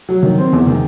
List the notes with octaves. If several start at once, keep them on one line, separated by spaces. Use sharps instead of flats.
F#3
D#3
C4
E2
D#3